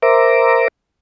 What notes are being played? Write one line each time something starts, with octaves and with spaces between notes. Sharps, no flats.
A#4 C5 E5 A#5 D6